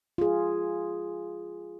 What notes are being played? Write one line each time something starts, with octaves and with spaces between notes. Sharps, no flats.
F4 G#4